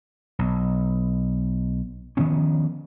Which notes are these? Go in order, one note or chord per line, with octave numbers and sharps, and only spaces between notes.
B1
D#3 F3 B3 C#4